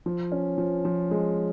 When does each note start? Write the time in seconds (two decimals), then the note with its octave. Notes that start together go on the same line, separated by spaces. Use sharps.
0.06 F3
0.32 C#4
0.58 F3
0.85 F3
1.11 G#3